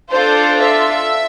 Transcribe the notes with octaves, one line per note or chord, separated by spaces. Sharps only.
D4 F4 A4 C5
E5